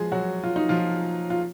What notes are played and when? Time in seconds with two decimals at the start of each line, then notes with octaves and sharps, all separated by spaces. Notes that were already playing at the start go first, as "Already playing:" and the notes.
Already playing: F3 G#3 G#4
0.12 F#3 F#4
0.44 F4
0.56 D#4
0.69 F3 F4
1.30 F4